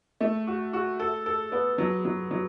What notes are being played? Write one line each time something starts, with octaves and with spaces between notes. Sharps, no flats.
A3
F#4
F#4
A4
A4
B3
F#3
F#3
F#3